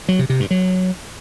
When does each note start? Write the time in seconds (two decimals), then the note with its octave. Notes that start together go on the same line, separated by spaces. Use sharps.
0.08 F#3
0.19 C3
0.30 C3
0.40 G2
0.51 F#3